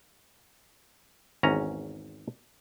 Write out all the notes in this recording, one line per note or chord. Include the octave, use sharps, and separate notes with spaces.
G#1 E2 C#4 A#5